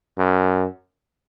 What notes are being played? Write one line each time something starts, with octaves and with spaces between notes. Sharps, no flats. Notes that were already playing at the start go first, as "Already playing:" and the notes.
F#2